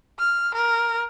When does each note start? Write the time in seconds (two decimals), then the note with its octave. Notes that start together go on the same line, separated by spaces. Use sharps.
0.19 F6
0.54 A#4